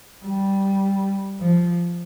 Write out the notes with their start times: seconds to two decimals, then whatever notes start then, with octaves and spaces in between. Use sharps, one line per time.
0.25 G3
1.41 F3